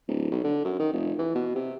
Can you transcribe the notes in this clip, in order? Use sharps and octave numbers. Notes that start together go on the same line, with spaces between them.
D1
B1
D3
F#2
D#3
F1
E3
B2
C3